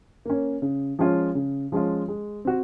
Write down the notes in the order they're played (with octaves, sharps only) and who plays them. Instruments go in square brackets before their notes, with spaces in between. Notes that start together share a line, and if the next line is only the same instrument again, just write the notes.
[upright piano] A#3 C#4
C#3
F3 G#3 C#4 F4
C#3
F3 G#3 C#4 F4
G#3
C4 F#4